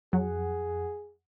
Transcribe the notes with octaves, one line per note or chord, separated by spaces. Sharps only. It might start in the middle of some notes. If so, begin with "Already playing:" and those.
F2 F#3 G#4 F#5